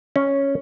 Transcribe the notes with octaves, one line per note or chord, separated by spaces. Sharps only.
C#4